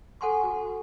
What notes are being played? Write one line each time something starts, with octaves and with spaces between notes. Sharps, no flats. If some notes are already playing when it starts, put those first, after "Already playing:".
A4 F#5 G#5 C6 C#6
F#4